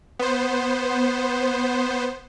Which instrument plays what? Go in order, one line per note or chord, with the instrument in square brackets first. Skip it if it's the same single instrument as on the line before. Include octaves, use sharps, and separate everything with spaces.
[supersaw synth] B3 C5